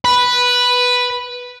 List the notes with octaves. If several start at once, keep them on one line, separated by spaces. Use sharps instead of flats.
B4